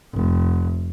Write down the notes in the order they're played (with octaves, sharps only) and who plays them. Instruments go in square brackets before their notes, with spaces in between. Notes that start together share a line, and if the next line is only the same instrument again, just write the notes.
[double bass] F1